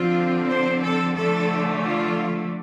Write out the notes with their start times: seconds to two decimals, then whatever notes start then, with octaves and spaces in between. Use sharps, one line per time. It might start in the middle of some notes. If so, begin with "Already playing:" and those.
Already playing: D3 F3 C4 F4
0.49 C5
0.82 A4
1.15 D3 F3 A3 A4
1.83 F4